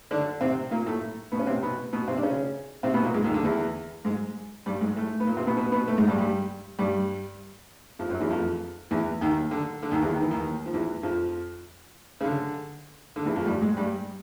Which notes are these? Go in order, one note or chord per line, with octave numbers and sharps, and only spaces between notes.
D3 D4
C3 C4
A#2 A#3
A2 A3
B2 B3
C#4
C3 C4
B2 B3
B2 B3
C3 C4
D4
C#3 C#4
C3 C4
B2 B3
A#2 A#3
G#2 G#3
D#2 D#3
D3
E2 E3
G#2 G#3
G2 G3
G#2 G#3
A2 A3
B3
A#2 A#3
C3 C4
B2 B3
B2 B3
B2 B3
A2 A3
G#2 G#3
G2 G3
G2 G3
G2 G3
F2 F3
F#2 F#3
E2 E3
F2 F3
E2 E3
D#2 D#3
D3
D3
D#2 D#3
E2 E3
D#3
E3
D#2 D#3
F3
E2 E3
F2 F3
C#3
D3
D3
E2 E3
F2 F3
G2 G3
G#2 G#3
G2 G3